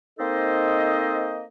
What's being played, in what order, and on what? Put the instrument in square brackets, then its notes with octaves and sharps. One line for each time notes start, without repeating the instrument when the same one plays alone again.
[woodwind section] A#3 C4 D#4 A4 C5 D#5